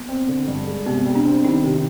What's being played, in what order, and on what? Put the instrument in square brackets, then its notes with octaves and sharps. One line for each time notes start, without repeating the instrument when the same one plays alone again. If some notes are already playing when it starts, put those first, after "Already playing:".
Already playing: [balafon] B3
[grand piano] C4
D3
G2
G#3
[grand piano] C3 [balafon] B3
[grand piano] G3
[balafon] D4
[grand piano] C4
[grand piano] D#3 [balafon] D#4
[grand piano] C3